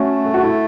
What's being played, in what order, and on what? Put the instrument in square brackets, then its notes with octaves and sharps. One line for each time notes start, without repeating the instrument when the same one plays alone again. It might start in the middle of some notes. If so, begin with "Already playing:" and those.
Already playing: [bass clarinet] A3 [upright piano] C#4 F#4
[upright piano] A4
F#4
E4 A4